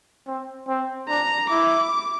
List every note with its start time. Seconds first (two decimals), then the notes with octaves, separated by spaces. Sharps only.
0.27 C4
0.68 C4
1.09 D4 A#5
1.50 E4 D6